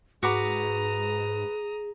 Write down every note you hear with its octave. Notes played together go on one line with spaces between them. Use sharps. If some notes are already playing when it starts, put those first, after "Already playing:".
G#2 F#4 G#4 B4 A#5 D6 D#6